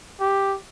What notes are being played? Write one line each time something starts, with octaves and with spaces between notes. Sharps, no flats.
G4